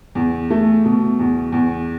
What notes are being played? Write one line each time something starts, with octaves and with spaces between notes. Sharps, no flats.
E2
A3
B2
E2
E2